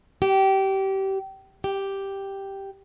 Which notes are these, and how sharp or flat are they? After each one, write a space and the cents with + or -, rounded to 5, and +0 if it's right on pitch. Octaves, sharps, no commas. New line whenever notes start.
G4 -25
G4 +0